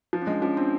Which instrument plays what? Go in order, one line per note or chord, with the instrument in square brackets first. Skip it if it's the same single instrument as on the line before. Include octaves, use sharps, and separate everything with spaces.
[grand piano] F3
[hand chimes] C#4
[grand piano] G#3 [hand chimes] D4
[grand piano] F3 [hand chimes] C#4
[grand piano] C4 [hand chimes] D4